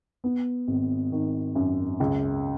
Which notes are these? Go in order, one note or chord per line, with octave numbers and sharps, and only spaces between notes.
B3
G#1
D#3
F#2
C#2